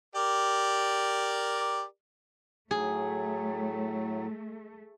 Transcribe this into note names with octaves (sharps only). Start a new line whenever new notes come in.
G4 A#4 D5
A2 F#3 A3 G#4